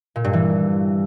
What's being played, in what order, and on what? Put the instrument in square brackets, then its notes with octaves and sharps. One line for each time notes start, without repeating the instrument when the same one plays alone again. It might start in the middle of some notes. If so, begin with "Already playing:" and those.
[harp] A#2
G2
E3